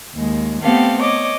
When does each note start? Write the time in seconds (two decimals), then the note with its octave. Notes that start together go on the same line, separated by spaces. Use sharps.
0.15 D#2 G#3
0.62 A3 B3 C4 G4 A4 F5
1.00 C#5 D#5 D6